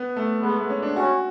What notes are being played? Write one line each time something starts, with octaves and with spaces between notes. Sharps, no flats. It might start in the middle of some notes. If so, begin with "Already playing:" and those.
Already playing: B3
A3
G#3 B3
A3
C#4
D4
C#4 F#4